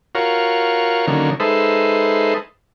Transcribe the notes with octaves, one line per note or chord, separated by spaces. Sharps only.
F4 F#4 A#4 C#5
D3 D#3 F#3 A#3 C#4
G#3 D#4 A4 B4 C5 E5